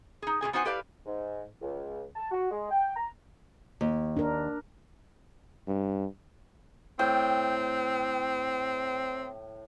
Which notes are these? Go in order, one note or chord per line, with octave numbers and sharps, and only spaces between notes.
D#4 G#4
B2 F#4 G#4 G#5
B3 D#4 F#4 C5 F#5 G#5
E4 G4 A4 B4 D5 F5
G#2
C#2
A5
F#4
G#3
G5
A#5
D#2
D4 A#4
G2
A2 C4 G5